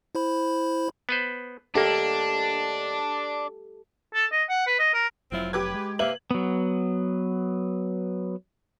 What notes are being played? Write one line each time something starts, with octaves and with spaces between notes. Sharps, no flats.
E4 C5 B5
B3 B4 C5
D#2 A#3 D4 G4 A4
A4
D#5
F#5
B4
D#5
A#4
F1 F#3 C4 E4 F4
G4 B4 D6 G#6
G#3
C3 A#3 B4 E5 F#7
F#3 B3